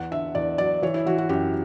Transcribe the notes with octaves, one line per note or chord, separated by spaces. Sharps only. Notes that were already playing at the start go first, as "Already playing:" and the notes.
Already playing: E2 F#5
D3 E5
E2 D5
F#3 D5
E3 C#5
E4
E3 F#4
F#4
F#2 G4